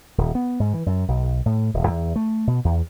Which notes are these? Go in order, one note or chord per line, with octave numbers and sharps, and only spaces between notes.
D#1
B3
G#2
E3
F#2
B1
A2
D#1
E2
A3
B2
E2